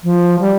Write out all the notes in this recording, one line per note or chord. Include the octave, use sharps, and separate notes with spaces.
F3
G3